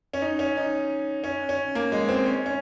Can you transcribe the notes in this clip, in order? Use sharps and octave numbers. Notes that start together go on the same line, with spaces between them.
C#4
D#4
C#4
D#4
C#4
C#4
A#3
G#3
C4
C#4
C#4